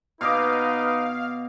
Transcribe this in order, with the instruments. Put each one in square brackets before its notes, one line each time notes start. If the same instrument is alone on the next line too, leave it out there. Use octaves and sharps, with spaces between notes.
[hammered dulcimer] B2 D#5 D6 [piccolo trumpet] D#4 [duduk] B4 [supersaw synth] F5